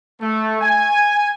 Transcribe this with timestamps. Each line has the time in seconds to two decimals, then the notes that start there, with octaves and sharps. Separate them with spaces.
0.21 A3
0.61 G#5